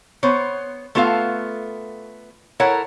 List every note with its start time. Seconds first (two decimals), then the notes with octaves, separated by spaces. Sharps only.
0.23 B3 C5 C#5
0.95 A3 B3 F4 A4 F5
2.60 E4 A4 A#4 C#5 F#5